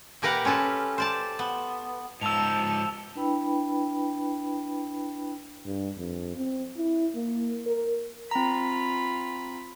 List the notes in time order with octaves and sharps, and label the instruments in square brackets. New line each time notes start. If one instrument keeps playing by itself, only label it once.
[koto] A#2 G4 A#4 B4 F5 F#5
C#4 F4 A4 B4
C5 D5 A5
B3
[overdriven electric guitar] G#2 F3 [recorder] A5 [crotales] E6 F7
[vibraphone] D4 E4 B4 G5 B5
[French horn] G2
F2
C4
E4
A#3
A#4
[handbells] C4 A#5 [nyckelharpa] F4 B5